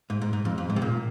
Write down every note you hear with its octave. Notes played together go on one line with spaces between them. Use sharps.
G#2
G#2
G#2
F2
F2
G#2
C3
A#2